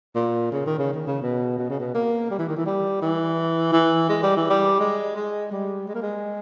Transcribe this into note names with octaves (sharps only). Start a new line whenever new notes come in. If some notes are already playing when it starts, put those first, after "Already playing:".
A#2
C#3
D#3
C#3
D#3
C#3
B2
B2
C#3
B2
A#3
G3
E3
D#3
E3
G3
E3
E3
G#3
G3
E3
G3
G#3
G#3
G3
G#3
A#3
G#3